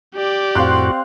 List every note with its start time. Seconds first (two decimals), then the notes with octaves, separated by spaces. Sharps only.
0.15 G4 D5
0.55 F2 A2 C4 F#4 F5 C6 F#6